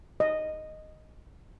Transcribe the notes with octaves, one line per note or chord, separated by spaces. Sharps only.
D#5